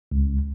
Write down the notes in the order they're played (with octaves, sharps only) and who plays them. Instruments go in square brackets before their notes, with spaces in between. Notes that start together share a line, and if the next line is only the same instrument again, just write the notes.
[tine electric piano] C#2